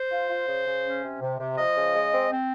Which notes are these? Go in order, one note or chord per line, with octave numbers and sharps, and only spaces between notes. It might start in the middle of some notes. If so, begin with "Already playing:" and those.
Already playing: C5
F4
F4
C#3
C#3
C#4
C3
C3
C3
F3 D#5
C#3
G#3
C4
C4